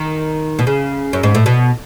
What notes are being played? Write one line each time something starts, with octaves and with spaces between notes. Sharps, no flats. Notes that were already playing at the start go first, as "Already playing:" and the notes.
Already playing: D#3
B2
C#3
F#2
G#2
A2
B2